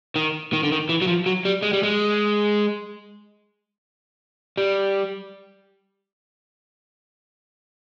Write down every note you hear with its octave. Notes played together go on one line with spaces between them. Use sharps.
D#3
D#3
D3
D#3
E3
F#3
F3
F#3
G3
G#3
G3
G#3
G3